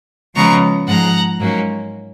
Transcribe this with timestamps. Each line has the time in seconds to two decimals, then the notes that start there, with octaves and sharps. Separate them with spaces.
0.35 C#3 F3 G#3 B3 A#5 C#6
0.87 G#2 F3 G#3 F#5 A#5
1.39 G#2 F#3 A#3 C#4